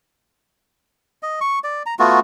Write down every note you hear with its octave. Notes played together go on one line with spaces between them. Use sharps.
D#5
C#6
D5
A#5
A3 B3 F4 F#4